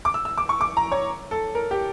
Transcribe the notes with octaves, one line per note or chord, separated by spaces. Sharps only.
D6
E6
E6
D6
C#6
D6
A#5
C#5
A4
A#4
G4